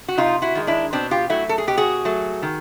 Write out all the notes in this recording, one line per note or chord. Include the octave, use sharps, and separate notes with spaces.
F#4
C3 D#4 F4
E4 F#4
D#3 G#3
D4 E4
B2 C4 D4
F4 G4
F#3 A3 E4 F#4
A4
G#4
B2 G4
F#4 G#4
F#3 A3
D#3